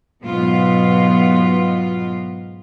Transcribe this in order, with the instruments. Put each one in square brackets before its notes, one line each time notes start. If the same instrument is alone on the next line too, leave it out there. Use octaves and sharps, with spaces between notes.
[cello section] G#2 B2 F#3 B3 F4